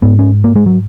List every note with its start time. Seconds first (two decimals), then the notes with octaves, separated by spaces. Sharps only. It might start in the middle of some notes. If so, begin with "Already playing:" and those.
0.02 G#2 B3
0.19 C#4
0.44 A#3
0.56 G#3
0.66 F#3